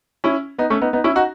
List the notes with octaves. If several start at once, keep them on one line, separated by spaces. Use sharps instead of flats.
C#4 E4
B3 D#4
A3 C#4
B3 D#4
B3 D#4
C#4 E4
D#4 F#4